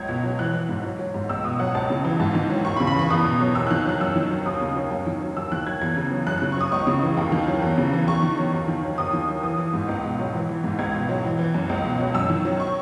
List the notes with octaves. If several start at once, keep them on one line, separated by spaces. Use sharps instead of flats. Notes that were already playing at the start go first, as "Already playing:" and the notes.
Already playing: C#2 F#3 G#6
B2
F#3
E3 F#6
E3
G#2
F#3
F#3
G#2
C#2 E6
B2 D#6
F#3 F#5
C#2 A5
C#3
E3
G#2 A5
D#3
F#3
D#2 C#6
B5
C#3
B5
E3 C#6
E2 D#6
B2
F#3
D#2 E6
D#3 F#6
F#3 F#6
F#2 E6
D#3
F#3
D#2 D#6
C#3
F#3
F#2
D#3
F#3
D#2 E6
D#3 F#6
F#3 G#6
E2 G#6
C#3
F#3
F#2 F#6
C#3 F#6
C#6
F#3 D#6
C#2 C#6
C#3
E3
D#2
D#3
F#3
E2
C#3
E3
E2 C#6
D#3
F#3
D#2
D#3
F#3
D#2 D#6
D#3
F#3
E3 D#6
E3
G#2
C#2
B2
F#3
E3
E3
G#2
C#2 G#6
B2
F#3
E3
E3
F#2
C#2
B2
F#3
F#2 E6
D#3
F#3
C#6